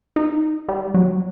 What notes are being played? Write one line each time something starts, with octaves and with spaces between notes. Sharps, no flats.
D#4
G3
F#3